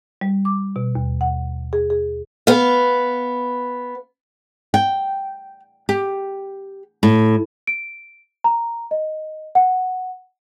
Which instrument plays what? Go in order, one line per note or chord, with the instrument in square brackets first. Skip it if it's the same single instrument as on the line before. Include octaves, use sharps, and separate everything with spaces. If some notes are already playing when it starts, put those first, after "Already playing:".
[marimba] G3
D6
B2
D#2
F#5
G#4
G#4
[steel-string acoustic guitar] B3 F5
[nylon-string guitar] G5
G4
A2
[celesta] D7
A#5
D#5
F#5